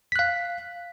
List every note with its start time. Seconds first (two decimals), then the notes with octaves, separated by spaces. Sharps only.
0.12 B6
0.16 F#6
0.19 F5